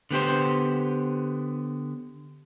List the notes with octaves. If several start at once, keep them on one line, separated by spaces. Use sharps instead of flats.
D3 B3 G4 C5